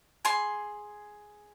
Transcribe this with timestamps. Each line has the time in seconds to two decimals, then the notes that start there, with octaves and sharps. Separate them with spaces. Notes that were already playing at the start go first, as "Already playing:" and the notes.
0.25 G#4 C6